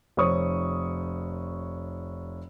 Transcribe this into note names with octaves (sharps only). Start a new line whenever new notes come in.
F1 C5 C#5 C#6 D#6